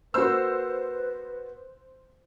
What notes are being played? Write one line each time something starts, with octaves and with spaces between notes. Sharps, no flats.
A#3 F#4 B4 C5 E6